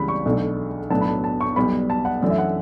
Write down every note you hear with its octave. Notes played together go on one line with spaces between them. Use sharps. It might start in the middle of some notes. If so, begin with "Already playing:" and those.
Already playing: C#2 C#3 E3 G3 B5
C#6
B1 B2 A3 D4
B1 A2 F#3 B3 D4 A5
B5
A5
A5
C#6
B1 B2 G3 B3 B5
A5
F#5
F#2 E3 A3 D4 D5
E5
F#5